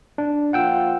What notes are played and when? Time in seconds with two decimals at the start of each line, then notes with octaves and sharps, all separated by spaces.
0.18 D4
0.53 F3 A#3 F4 F#5 G5 E6